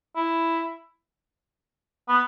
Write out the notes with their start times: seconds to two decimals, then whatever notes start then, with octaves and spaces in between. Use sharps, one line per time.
0.16 E4
2.08 B3